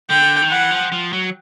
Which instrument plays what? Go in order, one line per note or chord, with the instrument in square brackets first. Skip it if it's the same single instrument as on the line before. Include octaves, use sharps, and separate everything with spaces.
[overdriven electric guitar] D3 [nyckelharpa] G5
[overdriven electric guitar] D#3
[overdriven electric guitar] E3 [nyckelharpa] F#5
[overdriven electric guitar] F3
F3
F#3